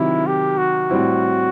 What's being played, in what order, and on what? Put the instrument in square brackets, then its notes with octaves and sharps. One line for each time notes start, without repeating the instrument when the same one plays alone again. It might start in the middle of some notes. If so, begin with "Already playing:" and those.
Already playing: [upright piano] C3 D#3 F#3 [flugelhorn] E4
[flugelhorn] G4
F#4
[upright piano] A2 G3 C4 E4